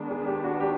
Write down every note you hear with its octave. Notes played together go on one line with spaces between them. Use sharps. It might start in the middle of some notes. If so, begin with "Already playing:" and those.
Already playing: D#3 G#3 B3 D4
G#4
G4
F#4
G4